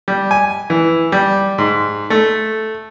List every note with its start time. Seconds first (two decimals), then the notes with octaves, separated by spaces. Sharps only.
0.08 G3
0.31 G#5
0.70 E3
1.12 G3
1.58 G#2
2.10 A3